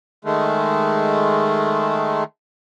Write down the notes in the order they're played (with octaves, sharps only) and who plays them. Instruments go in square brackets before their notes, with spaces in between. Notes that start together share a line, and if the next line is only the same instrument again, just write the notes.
[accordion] D#3 G#3 A3